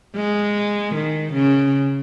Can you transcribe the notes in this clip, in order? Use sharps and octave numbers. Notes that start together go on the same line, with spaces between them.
G#3
D#3
C#3